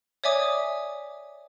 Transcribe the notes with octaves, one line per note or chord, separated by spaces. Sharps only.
C#5 D5 E5 G#5 D6 D#6